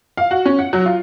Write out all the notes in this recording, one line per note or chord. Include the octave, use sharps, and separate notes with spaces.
F5
F#4
C#4
F#5
F#3
F4